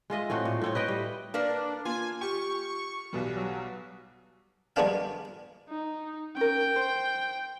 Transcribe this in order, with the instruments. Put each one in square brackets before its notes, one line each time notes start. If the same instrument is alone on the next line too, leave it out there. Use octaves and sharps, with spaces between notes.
[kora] G#3 F4 D#5 E5
A2 A3 C4 F#4
A#2
A2 C4 C#5
B4 D#5 G5
G3
[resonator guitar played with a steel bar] A#3 A#4 B4 [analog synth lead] D4
[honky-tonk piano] A#3 [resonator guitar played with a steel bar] F4 [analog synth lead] G#5
[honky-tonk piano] G4 [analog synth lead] C#6
[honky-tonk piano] B1 B2 G3
[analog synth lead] F#3
[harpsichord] G3 G#3 A#3 B3 D4 F5
[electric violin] D#4
[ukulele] C#4 A#4 [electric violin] G5
[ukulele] C5